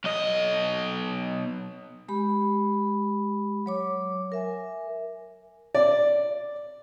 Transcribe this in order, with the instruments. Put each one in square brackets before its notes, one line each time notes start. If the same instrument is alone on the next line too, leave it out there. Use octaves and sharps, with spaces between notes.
[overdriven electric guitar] B1 D#5
[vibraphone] G#3 G4 B5
F#3 C#5 D6
A#4 E5 G#5
[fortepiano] D5